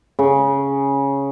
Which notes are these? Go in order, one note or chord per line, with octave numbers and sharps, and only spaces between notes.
C#3